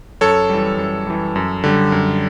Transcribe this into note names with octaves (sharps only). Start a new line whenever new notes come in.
F#2 A4 C#5
E3 G3
F#2
E3 G3
F#2
D3 G3
F#2